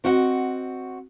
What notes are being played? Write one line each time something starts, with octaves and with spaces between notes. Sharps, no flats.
C4 F#4 D#5 E5 F#5